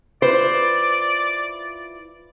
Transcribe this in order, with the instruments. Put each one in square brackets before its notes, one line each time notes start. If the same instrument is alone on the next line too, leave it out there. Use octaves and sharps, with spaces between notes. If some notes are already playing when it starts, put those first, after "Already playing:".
[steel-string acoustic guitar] E4 F4 B4 [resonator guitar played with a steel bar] C5 [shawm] D5